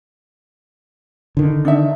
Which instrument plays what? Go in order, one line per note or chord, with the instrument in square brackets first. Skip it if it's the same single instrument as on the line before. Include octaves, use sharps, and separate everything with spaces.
[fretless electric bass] D3 D#3
[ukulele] D4 D#4 E5